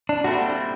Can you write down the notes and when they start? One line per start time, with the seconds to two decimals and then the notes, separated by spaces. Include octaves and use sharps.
0.09 D4
0.24 A#2 G3 C4 E4 F#4 A4